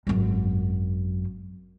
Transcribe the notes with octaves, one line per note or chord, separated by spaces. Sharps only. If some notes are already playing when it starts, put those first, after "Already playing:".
G#1 F#2